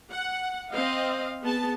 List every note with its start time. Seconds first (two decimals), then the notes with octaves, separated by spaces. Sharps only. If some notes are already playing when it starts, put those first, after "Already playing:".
0.11 F#5
0.70 C4 D#5 F5
1.42 B3 G#4 A5